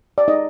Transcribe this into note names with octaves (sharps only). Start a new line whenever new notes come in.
D5
D#4 D#5